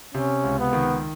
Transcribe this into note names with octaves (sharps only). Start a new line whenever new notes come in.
C3 C#4
C#2
B3
D#3